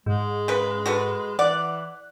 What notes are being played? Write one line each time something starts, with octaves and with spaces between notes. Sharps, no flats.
G#2 G#3
C#3 B4
F#4 A4 B4
E3 D5 F#5 F#6